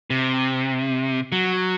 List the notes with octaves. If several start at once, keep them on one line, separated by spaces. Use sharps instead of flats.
C3
F#3